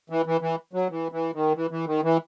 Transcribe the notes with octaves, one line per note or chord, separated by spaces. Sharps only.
E3
E3
E3
F#3
E3
E3
D#3
E3
E3
D#3
E3